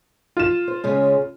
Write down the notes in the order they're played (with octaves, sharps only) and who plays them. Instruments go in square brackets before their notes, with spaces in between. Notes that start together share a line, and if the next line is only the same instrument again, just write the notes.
[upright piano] F4 E7
[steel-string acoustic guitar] C5
C#3 G#3 C#4